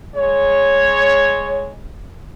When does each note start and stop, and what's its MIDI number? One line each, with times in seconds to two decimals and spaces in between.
0.16 1.77 56
0.16 1.77 73